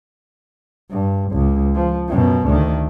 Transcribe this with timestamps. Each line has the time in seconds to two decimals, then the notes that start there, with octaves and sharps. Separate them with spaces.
0.90 G2
1.32 C#2
1.75 F3
2.08 F#2 B2
2.47 D2 D#3